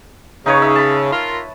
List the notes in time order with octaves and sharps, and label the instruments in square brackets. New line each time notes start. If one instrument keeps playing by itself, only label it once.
[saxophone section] C#3 [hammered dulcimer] D#4 B4 C#5
[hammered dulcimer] E5
A5 B5
[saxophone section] F4 A#4